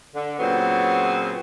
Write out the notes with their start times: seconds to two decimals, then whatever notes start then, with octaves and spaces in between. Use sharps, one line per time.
0.15 D3
0.39 A#2 C#3 F#3 B3 C4